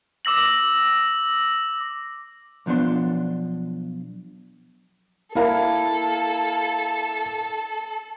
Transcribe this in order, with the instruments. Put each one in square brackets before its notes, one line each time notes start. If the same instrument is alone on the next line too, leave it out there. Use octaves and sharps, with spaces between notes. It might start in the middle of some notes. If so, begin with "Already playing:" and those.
[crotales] D6 E6 A#6 F#7
[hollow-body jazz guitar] B1 F3 B3 D4 C6
[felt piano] A#3 E4 F5 [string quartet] A4